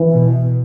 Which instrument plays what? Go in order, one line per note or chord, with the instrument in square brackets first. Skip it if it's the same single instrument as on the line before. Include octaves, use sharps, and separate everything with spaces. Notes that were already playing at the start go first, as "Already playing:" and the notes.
Already playing: [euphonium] E3
[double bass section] B2